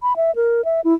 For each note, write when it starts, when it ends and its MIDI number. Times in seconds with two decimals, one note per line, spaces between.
0.02 0.16 83
0.16 0.34 76
0.36 0.64 70
0.65 0.81 76
0.84 0.94 64